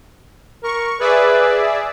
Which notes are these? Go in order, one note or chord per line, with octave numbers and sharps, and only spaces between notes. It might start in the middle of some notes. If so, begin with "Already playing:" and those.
A#4 C#6
G#4 B4 D5 E5